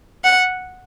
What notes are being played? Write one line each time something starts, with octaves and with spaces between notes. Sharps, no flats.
F#5